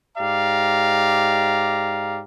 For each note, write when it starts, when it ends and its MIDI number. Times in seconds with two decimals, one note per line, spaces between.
0.18 2.21 44
0.18 2.21 67
0.18 2.21 74
0.18 2.21 77
0.18 2.21 82